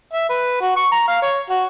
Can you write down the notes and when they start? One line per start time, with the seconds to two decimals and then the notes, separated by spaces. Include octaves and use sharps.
0.13 E5
0.30 B4
0.61 F#4
0.76 C#6
0.91 A#5
1.08 F5
1.22 C#5
1.50 F#4